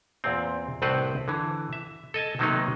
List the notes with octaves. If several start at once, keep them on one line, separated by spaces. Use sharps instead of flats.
E2 A#2 C4
C2 A2 C4 B4 C5 F#5
D3 E3
E5
A4 D#5 G#5 A5
C3 D#3 F#3 A#3 B3 D#4